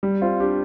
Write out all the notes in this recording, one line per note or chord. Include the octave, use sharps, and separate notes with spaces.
G3
C4 F4
D4 G4